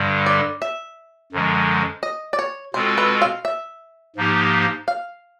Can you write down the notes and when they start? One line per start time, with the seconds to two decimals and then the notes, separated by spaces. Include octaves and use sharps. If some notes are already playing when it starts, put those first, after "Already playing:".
Already playing: G2 D3 G3
0.26 D5
0.62 E5
1.32 F#2 D3 F3 G#3
2.03 D#5
2.33 D5
2.39 C#5
2.74 B2 G#3 C4 F4 A4 C5
2.98 B4
3.22 F5
3.45 E5
4.16 G#2 F3 A#3 D#4 G4
4.88 F5